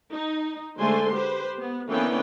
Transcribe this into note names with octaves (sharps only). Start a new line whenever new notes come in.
D#4
D3 G#3 A3 C5 G#5 C6
G4 B4 C5
B3
D3 E3 A#3 B3 C#4 G5